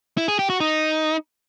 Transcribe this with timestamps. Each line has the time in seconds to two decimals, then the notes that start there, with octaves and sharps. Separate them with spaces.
0.17 E4
0.28 G#4
0.39 G4
0.50 F#4
0.60 D#4